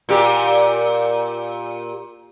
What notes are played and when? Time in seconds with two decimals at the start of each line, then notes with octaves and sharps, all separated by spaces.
0.09 A#2 G4